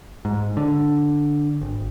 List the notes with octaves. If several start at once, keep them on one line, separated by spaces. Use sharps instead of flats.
G#2
D3
G#1